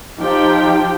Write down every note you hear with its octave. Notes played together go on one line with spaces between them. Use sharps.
F3 D#4 G4 G5